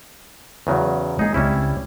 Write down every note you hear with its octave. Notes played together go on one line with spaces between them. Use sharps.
E2 C#3 F#3
G#3 A#3 D#4 G#4
C#2 G3 C4 C#4 E4